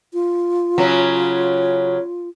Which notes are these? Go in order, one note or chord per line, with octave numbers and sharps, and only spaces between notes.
F4
C#3 F#3 C#4